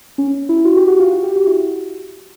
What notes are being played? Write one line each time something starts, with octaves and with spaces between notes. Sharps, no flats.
C#4
E4
F#4
G4
F#4
F4
F#4
G4
F#4
E4